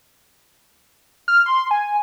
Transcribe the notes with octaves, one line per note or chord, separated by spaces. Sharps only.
F6
C6
G#5